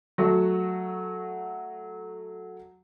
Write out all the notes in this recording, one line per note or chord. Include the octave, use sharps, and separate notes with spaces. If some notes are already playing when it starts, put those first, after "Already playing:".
F#3 A3 F#4